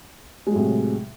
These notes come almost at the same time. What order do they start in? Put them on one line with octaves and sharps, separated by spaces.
G#3 F#3 A2 C3